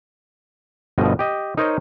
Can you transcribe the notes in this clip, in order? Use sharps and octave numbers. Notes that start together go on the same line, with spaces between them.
G1 G2 B2 F3 D#5
G4 D#5
D#4 A#4 C5 C#5 D#5